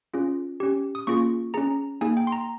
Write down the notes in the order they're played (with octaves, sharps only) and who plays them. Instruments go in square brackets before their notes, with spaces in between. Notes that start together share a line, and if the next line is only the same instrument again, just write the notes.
[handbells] C#4 F4 G#4
C#4 G4
D#6
A#3 C#4 F4 G#4 C#6
C#4 G#4 A#5
A#3 D#4 G#4 G#5
G5
C6
A#5